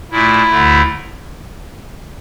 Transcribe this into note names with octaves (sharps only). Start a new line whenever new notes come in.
A#2 A3 E4
D2 D3 A3